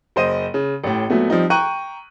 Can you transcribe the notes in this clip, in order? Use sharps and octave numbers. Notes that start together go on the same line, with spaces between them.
F#1 C5 D#5 D#7
C#3
A1 A2
A#2 F#3 A3 B3
F3 G3 C4 D#4
G5 A#5 C#6 F#6 D#7